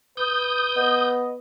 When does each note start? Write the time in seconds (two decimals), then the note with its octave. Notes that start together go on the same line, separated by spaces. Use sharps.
0.17 B4 D#6 G6
0.76 B3 D#5